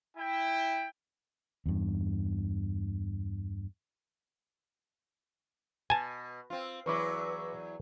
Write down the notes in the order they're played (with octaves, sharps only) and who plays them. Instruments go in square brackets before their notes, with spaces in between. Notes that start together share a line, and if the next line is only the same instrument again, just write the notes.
[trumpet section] E4 G5
[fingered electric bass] E2 G2
[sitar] B2 [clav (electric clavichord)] G#5 A5
[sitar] C4 F4
[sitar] E2 F#3 E4 [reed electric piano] B4 C#6 D6